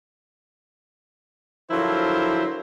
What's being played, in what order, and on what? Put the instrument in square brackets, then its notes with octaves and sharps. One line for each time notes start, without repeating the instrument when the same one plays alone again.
[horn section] D3 F3 F#3 E4 A#4 C5